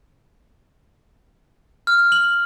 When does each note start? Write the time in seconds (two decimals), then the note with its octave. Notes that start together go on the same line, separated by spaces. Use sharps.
1.87 F6
2.12 F#7